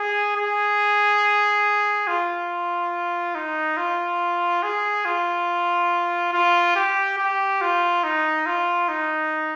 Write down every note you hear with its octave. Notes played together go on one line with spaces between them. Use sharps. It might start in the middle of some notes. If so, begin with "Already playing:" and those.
Already playing: G#4
G#4
F4
D#4
F4
G#4
F4
F4
G4
G4
F4
D#4
F4
D#4